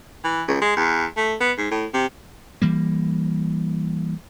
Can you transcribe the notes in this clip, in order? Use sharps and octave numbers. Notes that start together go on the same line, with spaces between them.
E3
C#2
G#3
E2
A3
B3
G#2
A2
C3
E3 G3 A#3